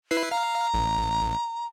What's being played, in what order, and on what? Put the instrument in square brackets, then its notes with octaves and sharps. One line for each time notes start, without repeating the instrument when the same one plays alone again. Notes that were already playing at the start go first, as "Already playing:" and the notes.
[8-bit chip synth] E4 B4 C7
[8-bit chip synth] F5 [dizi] A#5
[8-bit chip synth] A1